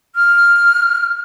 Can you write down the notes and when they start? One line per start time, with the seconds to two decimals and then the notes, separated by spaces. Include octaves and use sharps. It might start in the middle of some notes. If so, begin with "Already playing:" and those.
0.15 F6